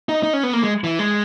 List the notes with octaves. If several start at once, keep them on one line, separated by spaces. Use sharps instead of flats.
D#4
D#4
C#4
B3
A#3
G#3
E3
G#3